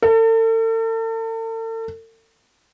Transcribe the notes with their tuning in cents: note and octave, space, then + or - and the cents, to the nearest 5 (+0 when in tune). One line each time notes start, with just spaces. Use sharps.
A4 +40